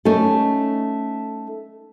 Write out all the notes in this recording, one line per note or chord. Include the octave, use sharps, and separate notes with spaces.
A3 C#4 D#4 A4